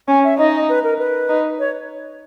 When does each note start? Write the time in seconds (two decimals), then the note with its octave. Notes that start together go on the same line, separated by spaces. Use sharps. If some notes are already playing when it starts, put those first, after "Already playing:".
0.08 C#4 G#5
0.24 E5
0.38 D#4 D#5
0.69 B4
0.83 A#4
0.99 B4
1.29 D#4
1.59 C#5